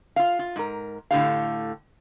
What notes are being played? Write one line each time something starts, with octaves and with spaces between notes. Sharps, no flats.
F4 F5
F4
G#2 A#4
A2 D3 G4 F5